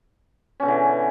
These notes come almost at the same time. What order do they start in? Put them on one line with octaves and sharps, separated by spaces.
C#4 B2 D3 E3